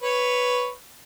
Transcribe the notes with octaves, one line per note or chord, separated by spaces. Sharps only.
B4 C#5